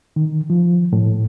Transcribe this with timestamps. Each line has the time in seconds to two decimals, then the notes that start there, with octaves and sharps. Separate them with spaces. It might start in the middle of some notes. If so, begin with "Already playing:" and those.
0.16 D#3
0.50 F3
0.93 A2